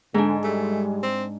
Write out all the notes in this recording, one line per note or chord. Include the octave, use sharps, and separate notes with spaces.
G#2 D3 G#3 D4
G3 A3
C4